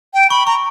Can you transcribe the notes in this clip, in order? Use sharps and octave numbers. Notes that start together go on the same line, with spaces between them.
G5
B5 C#6
A#5 C#6